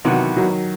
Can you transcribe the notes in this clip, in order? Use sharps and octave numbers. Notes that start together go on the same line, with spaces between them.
C3 D#3 E3 F#3 B3 F#4
D#3 F#3